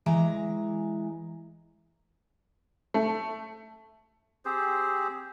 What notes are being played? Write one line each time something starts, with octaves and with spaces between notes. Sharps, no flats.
E3 G#3 A#5
A3
C4 G4 G#4 C5